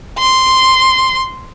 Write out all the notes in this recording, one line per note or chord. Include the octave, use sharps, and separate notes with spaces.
C6